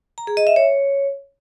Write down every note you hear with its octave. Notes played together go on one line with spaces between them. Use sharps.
A#5
G#4
D#5
E5
C#5